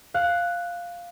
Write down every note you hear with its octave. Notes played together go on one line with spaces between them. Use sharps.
F5 F#6